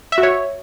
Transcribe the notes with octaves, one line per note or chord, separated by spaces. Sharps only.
E5
F#4
C#5